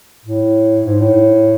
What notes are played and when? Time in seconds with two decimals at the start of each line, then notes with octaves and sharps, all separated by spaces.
0.25 A2
0.84 G#2
1.00 A2